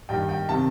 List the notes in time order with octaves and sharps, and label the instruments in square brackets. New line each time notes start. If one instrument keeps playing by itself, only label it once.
[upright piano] G2 D#3 G5
G5
C3 D#3 A5